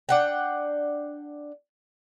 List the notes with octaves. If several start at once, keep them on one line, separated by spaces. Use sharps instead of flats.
D4 F#5 G5